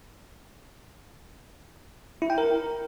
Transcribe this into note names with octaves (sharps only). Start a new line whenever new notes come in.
E4
G5
A#4